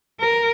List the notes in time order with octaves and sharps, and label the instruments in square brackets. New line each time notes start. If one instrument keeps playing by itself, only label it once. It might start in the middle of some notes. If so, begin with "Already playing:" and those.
[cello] A#4